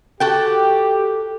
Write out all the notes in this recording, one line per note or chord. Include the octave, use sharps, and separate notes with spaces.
F#4 G4 A4 G5